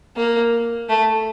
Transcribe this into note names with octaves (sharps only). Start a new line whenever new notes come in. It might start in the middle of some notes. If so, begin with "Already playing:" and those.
A#3
A3